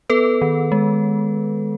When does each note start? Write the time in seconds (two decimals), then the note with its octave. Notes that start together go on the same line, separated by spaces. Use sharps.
0.10 B3 A4 B4
0.42 D#3
0.72 G#3